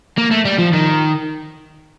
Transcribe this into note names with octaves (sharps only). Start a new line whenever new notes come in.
A#3
A3
G3
F3
D#3